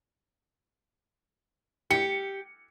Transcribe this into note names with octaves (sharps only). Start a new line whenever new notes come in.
G4 C#7